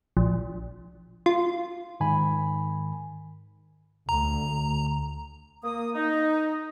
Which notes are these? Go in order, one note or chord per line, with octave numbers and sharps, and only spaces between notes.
A#1
F4
G#2 D#3 G#5 B5
D2 A#5
A#3 D#6
D#4